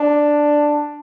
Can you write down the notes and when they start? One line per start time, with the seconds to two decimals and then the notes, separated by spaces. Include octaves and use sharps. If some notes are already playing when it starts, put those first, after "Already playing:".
Already playing: D4